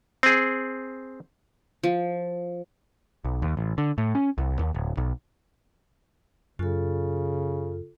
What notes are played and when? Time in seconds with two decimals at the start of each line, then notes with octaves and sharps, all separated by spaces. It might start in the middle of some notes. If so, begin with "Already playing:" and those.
0.23 C4 G#4
1.83 F3
3.25 B1
3.42 D#2
3.57 A1
3.78 D3
3.98 A2
4.15 C#4
4.38 C2
4.59 D#2
4.74 D1
4.97 B1
6.59 F#2 C#3 F4 A4